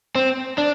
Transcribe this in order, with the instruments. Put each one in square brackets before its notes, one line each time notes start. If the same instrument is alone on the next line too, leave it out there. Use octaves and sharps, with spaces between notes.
[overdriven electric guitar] C4
D4